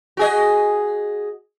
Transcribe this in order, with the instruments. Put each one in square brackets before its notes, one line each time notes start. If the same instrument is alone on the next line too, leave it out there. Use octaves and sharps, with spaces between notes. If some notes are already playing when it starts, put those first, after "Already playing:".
[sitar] F#4 G#4 D#5